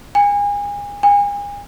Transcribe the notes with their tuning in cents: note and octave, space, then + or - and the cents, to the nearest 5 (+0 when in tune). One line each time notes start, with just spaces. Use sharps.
G#5 -30
G#5 -35